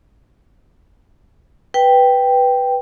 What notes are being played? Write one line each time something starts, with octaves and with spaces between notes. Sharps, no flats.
B4 G5